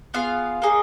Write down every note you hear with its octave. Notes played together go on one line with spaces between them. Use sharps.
B3 F4 G#4 F5
A#3 D#4 G#4 D#5